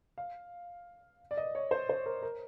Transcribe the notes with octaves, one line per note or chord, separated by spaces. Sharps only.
F5
D5
D#5
C#5
C5
C5
A#4
A#4